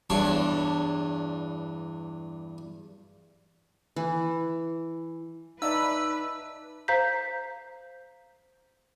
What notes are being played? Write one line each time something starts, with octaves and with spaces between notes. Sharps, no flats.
E2 G2 D4 C#5
E3
D#4 B4 D5 E5 A5 E6
C5 F5 A#5 G6 B6